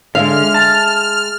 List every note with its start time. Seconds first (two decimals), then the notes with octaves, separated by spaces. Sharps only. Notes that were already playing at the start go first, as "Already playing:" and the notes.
0.15 D3 G#3 E5 F5 F6
0.54 A5